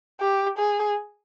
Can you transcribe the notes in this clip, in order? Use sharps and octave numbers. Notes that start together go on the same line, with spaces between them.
G4
G#4